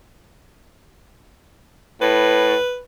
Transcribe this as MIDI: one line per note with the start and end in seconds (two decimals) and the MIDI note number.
2.01 2.55 45
2.01 2.81 71